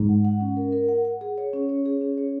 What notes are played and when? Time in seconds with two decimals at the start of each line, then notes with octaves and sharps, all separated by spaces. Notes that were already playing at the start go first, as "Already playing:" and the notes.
Already playing: G#2
0.09 F#5
0.25 F#5
0.40 C#4
0.57 A#4
0.72 A#4
0.89 F#5
1.05 F#5
1.21 G#4
1.38 C#5
1.53 C#4
1.69 C#5
1.86 G#4
2.01 C#4
2.18 C#5